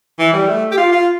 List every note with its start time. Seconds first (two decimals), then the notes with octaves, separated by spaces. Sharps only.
0.19 E3
0.33 G3
0.48 A3
0.72 G4
0.77 F4
0.92 F4